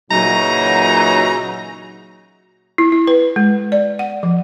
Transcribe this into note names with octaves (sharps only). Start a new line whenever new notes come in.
A#2 C#3 E3 F#3 D#4 A#5
E4
E4
B4
G#3
D5
F#5
F3